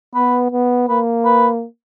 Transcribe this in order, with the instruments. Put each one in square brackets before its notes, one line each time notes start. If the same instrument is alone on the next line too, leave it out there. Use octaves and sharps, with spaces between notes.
[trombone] B3 [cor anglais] B4
[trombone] B3
[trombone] A#3 [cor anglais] B4
[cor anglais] B4